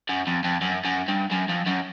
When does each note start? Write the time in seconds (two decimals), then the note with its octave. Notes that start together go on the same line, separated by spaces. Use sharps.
0.09 F#2
0.27 F2
0.44 F2
0.61 F#2
0.85 F#2
1.08 G2
1.31 F#2
1.49 F2
1.66 F#2